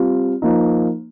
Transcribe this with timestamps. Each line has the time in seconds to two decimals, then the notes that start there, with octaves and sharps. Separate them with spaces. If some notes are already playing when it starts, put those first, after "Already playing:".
Already playing: G3 C4 F4
0.42 F3 A#3 D#4